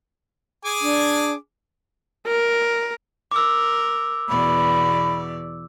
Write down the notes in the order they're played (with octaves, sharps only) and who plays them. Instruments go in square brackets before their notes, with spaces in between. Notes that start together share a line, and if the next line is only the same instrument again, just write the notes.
[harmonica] G#4 G#5 D6
[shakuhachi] D4
[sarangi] A#4
[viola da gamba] A#4 [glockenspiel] D6 E6
[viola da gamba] E2 B2 D5 [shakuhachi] B5